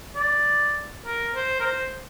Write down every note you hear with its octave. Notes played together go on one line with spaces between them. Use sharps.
D5
A#4
C5
A#4
C5